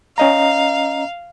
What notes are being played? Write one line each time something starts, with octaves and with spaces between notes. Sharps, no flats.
C#4 D#5 F5 A#5